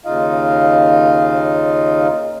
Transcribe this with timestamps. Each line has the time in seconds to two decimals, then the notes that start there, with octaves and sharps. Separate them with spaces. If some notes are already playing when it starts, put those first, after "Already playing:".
0.05 D#2 C#3 D#4 F4 D#5 F5